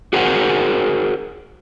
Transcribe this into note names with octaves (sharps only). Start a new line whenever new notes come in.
F#4 G#4 A#4 C5 F#5